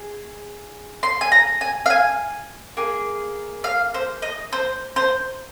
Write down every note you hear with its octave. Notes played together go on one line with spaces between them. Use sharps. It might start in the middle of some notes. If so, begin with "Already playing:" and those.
Already playing: G#4
C6
G#5
A#5
G#5
F5
G#5
A#3 G#4
F5
C5
D#5
C5
C5